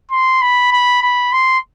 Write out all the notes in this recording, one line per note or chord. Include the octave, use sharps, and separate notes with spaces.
C6
B5
B5
B5
C6